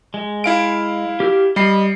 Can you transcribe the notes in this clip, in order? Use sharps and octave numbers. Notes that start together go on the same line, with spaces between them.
G#3
E4 F5 D7
G4 F6
G3 D#5 B5 C7